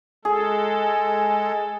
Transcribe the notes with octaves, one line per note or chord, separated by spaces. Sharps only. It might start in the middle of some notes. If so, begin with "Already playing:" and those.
G#3 G#4 A4